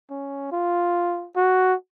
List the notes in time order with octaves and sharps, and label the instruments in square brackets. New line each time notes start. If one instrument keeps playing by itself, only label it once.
[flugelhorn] C#4
F4
F#4